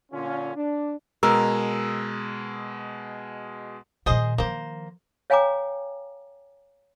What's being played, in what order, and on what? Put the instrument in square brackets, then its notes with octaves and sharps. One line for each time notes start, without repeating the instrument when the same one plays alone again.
[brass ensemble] A#2 D3 C#4 F4
D4
[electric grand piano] B2 G#3 E6 [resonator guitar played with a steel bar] A#4
[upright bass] A#2 D#3 [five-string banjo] G#4 C5 D#5
[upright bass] D#3 F3 [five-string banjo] A#3 C5
[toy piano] C#5 F5 G5 G#5 A#5 D6